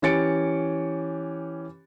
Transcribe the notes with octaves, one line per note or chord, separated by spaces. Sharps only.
E3 C#4 G4 A6 C#7 D7